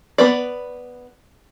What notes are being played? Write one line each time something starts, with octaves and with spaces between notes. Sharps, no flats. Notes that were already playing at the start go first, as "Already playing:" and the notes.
B3 B4 D5